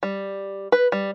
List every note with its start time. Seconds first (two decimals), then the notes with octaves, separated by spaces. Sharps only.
0.03 G3
0.72 B4
0.92 G3